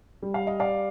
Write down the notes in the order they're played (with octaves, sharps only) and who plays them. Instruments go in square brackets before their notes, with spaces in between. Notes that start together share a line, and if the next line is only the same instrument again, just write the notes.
[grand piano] G3
F5
D#5
D5 F5